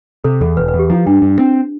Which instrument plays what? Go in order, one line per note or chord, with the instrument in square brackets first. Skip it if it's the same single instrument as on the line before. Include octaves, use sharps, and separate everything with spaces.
[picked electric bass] C3 [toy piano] A4
[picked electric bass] E2 [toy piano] A4
[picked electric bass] E1 [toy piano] B4
[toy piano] B4
[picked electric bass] E2
[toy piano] G4
[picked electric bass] F3 [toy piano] E4
[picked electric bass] G2 [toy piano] D4
[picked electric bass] G2
C4